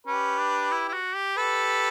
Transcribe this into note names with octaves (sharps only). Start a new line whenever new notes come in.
C#4 G4 B4
D4
E4
E4
F#4
G4
G4 A4 B4